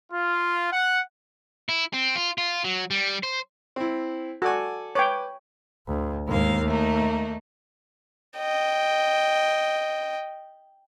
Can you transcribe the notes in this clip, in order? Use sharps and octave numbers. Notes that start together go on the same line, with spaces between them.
F4
F#5
E4
C4
F4
F4
F#3
G3
C5
C4 E4
F#4 A4 D5 G#5
B4 C#5 G5 D6
D2
D#2 G#2 A#3 F5
A3 A#3 D#4
D#5 G5